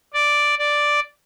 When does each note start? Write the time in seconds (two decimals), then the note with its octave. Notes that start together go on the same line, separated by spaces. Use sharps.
0.14 D5
0.59 D5